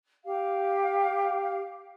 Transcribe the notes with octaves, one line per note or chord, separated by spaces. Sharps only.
G4 F5